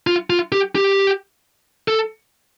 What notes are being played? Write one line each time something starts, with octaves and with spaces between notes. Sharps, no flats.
F4
F4
G4
G4
A4